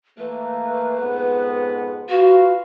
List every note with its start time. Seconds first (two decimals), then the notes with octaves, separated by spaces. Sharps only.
0.18 E3 A3 A#3 B4
1.00 F2 G#2 B3
2.09 F4 F#4 B4 F5